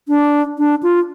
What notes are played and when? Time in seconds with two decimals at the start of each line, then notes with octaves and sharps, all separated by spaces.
0.08 D4
0.58 D4
0.83 F4